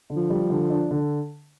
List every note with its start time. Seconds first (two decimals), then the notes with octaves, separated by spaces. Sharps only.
0.10 D3
0.16 F3
0.30 G3
0.50 D3
0.70 D4
0.91 D3